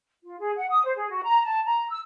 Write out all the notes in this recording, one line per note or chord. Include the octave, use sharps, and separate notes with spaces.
F4
G#4
F#5
D#6
C5
G#4
F#4
A#5
A5
A#5
E6